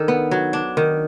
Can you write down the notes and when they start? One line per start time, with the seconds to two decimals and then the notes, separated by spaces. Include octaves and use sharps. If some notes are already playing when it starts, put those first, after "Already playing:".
Already playing: D#3 D4 A4
0.08 B3
0.31 F#3
0.53 D4
0.77 D#3